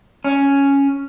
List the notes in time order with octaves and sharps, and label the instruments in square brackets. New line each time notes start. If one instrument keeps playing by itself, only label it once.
[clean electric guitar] C#4